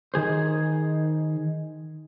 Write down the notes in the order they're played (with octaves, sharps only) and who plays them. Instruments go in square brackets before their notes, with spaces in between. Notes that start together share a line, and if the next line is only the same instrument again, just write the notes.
[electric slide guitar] D#3 G#4 C5